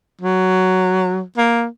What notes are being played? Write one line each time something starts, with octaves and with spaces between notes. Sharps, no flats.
F#3
A#3